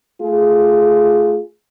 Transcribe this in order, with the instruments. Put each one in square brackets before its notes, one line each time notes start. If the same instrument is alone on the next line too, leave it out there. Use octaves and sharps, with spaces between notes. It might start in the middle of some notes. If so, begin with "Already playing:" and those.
[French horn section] A3 F4 G#4